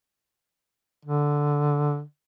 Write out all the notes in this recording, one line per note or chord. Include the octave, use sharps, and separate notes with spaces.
D3